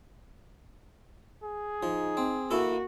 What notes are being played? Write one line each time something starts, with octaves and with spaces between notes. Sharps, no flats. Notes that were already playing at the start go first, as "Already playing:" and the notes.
G#4
F3 D#4
C4
A#3 E4 F#4 A4